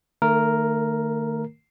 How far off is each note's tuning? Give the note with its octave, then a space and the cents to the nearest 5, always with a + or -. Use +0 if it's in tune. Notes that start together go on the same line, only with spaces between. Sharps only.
D#3 -25 A3 +35 A#4 +0